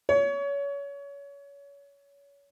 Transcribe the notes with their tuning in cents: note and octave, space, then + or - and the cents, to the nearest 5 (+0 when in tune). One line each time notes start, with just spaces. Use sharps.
C#5 +30